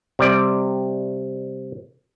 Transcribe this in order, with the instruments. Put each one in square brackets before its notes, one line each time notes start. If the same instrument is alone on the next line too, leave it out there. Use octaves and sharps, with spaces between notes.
[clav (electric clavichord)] C3 G3 D5